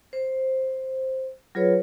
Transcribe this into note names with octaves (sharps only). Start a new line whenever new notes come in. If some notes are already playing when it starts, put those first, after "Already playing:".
C5
F#3 F4 G#4 B4 C#5